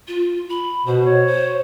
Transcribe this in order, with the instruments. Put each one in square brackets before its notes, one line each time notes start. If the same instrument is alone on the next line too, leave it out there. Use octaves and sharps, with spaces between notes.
[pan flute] F4
B5
[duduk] B2 [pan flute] C5
[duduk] C#5
[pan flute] C5